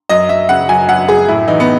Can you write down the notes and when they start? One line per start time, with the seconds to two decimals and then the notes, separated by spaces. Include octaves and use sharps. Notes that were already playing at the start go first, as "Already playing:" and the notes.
0.09 F#2 D#5
0.29 F#2 E5
0.49 C#3 F#5
0.69 F#2 G#5
0.89 F#2 F#5
1.08 F#2 G#4
1.28 A2 E4
1.48 E3 D#4
1.60 B3